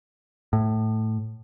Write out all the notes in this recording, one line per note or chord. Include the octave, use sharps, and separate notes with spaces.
A2